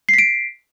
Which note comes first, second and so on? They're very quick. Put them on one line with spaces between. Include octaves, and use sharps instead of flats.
C7 B6 D7